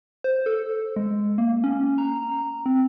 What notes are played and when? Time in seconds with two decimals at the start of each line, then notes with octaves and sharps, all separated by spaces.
0.24 C5
0.46 A4
0.96 G#3
1.38 A#3
1.64 C#4
1.98 A#5
2.66 C4